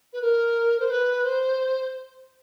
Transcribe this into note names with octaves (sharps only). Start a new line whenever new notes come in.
B4
A#4
C5
B4
C5